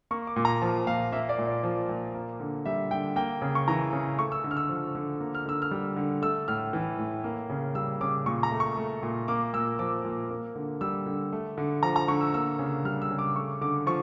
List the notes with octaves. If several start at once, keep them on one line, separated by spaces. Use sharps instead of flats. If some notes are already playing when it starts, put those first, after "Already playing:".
A#3 C#6
D6
A#2
A#5
F3 A5
A#2 F5
A#3 E5
D5
A#2
D5
F3
A#2
A#3
D3
G3 E5
D3 G5
A#3 G5
C#3
C#6
E3 A#5
C#3
A3 C#6
E6
D3
F6
E6
F3
D3
A#3
F6
D3 E6
F6
G3
D3
A3 E6
A2 F6
E3
A2
A#3
C#3
G3 E6
C#3 D6
A#2 C#6
A#5
A3
C#6
A3
A#2
A#3 D6
A#2 E6
F3 D6
A#2
A#3
D3
G3 E6
D3
A3
D3
F3 A#5
A#5
D3 C#6
E6
A#3 E6
C#3
G3 F6
E6
C#3
D6
A3 C#6
D3 D6
F3 C#6